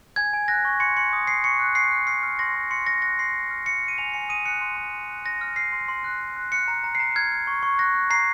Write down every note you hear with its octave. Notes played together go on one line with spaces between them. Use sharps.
G#5 G#6
G#5
F#6 A#6
C#6
C6 C#7
C6 C#7
D#6
D#6 C7
C#6 C#7
F#6
C#6 C7
F#6
F6 C7
F6
C6 A#6
C6
C6 C#7
C6 A#6
F#6 A#6
C6 C7
C6
F6
F6 C#7
F6
D#7
G#5 F7
G#5 C#7
D#6 D#7
F#6 C#7
C6
C6
C6
F#6
C6 A#6
F6
F6 C7
C6
C6
F#6
F#6
F#6
F#6 C#7
A#5
A#5
C7
A#5
F6 G#6
F6
C#6
C#6
F#6 A#6
F#6
A#5 C7